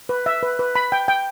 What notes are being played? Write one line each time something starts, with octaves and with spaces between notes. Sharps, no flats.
B4
E5
B4
B4
B5
G5
G5